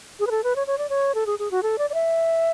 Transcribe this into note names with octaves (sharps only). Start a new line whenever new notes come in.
G#4
B4
A4
B4
C#5
C#5
D5
C#5
A4
G#4
G#4
F#4
A4
D5
D5
E5